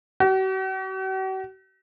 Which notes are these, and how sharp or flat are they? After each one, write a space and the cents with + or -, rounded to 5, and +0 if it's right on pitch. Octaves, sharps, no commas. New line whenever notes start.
F#4 +45